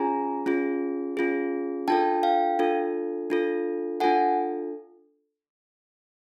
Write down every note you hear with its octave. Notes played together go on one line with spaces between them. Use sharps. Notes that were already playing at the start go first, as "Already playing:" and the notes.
Already playing: C#4 F4 G#4 G#5 A#5
C#4 F4 G#4
C#4 F4 G#4
D4 F4 A4 G5 A5
F5 G5
D4 F4 A4
D4 F4 A4
D4 F4 A4 F#5 G#5